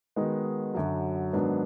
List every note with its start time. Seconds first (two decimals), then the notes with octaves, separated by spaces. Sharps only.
0.16 D#3 G#3 B3 D#4 F#4
0.74 F#2 D3 F#3
1.33 G#2 D#3 F#3 B3 D4